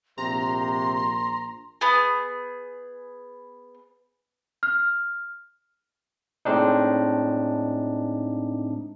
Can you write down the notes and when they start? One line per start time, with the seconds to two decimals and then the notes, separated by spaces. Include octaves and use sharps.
0.18 A#1 C3 A#5 C6
1.81 B3 G#4
4.63 F6
6.45 A2 G#3 C4 D4 D#4